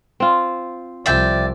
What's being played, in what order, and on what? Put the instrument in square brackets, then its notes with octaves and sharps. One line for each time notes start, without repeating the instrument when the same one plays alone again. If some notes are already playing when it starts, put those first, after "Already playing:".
[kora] C4 F4
[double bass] C2 F3 [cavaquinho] D5 E5 G5